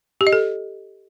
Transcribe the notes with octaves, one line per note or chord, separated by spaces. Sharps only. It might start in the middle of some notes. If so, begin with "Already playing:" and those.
G4
D#5
A4